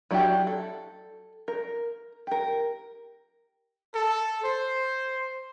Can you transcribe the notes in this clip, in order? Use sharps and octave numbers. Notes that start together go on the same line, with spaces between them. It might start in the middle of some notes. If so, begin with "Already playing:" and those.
F#3 D4 E4 F#4 G4
A4
A#4
G4 A#4
A4
C5